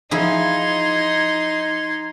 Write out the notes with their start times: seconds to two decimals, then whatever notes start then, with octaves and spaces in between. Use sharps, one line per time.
0.11 F3 D#4 E4 G#4 C6 G#6